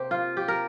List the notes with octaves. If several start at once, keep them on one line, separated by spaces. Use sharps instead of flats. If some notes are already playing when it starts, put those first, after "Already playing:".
Already playing: C3 A#3 G4 C5
F4
G4
A#4